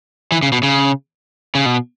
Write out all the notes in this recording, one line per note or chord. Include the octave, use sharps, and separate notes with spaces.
E3
C#3
B2
C#3
C#3
B2